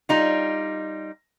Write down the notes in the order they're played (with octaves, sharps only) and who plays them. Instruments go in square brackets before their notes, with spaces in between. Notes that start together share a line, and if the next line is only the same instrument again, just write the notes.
[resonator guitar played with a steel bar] G3 D#4 F4